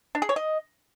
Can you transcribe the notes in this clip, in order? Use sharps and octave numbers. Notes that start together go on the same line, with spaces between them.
D4
G#4
C#5
D#5